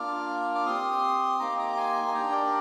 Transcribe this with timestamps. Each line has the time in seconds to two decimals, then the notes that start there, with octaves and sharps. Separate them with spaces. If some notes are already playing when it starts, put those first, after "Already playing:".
Already playing: A#3 D4 F4 D6 F6
0.55 D6
0.66 C4 G4 C6 D#6
1.40 A#3 D#4 G4 A#5 D6
1.59 A#5 D6
1.77 G#5 C6
2.08 G#5
2.14 D4 G4 G5 A#5
2.32 A#4 D5